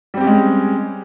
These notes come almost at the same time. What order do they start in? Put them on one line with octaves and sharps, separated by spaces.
G3 C4 G4 C#4 G#3